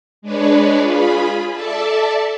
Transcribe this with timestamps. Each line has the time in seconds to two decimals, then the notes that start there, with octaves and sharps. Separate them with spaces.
0.22 G#3 D4 B4 C#5 D5
0.80 F4 G#4 B5
1.53 A4 D5 E5 A5